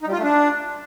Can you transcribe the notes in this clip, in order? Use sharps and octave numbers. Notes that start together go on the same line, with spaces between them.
D#4
G3
F4
A3
D4